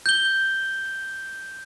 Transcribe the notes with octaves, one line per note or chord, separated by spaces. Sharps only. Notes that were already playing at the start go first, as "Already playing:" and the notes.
G6 G7